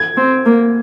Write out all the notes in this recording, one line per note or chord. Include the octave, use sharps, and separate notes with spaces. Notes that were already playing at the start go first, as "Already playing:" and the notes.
Already playing: G#6
C4
A#3